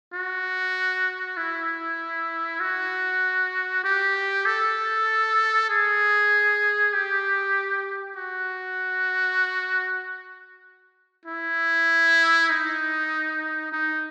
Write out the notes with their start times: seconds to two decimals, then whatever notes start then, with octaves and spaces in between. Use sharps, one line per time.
0.13 F#4
1.37 E4
2.60 F#4
3.84 G4
4.46 A4
5.69 G#4
6.93 G4
8.16 F#4
11.25 E4
12.50 D#4
13.72 D#4